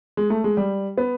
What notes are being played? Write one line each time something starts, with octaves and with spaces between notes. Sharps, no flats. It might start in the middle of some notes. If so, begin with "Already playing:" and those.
G#3
A3
G#3
G3
B3